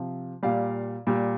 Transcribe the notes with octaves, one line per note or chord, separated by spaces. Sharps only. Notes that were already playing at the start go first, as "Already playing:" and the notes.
Already playing: C3 F3
A#2 G3 D5 F5
A#2 G3